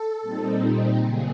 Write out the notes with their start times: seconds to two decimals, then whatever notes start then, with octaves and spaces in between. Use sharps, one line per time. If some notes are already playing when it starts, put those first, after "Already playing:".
Already playing: A4
0.22 A#2 G3 C4 D#4
0.98 C#3 F#3 A#3 G#4